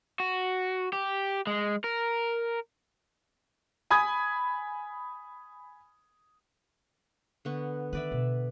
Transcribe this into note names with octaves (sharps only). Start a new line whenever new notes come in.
F#4
G4
G#3
A#4
G#5 B5 D#6 G#6
D3 B3 C#6
D#3 B4 D5 E5
B2